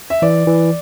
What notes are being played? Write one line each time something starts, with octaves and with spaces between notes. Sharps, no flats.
E5
E3 D5
E3